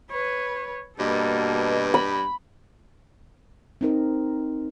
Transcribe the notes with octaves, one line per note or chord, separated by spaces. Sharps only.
B4 C#5
G2 B2 A#3 A4
B5
C4 D#4 A#4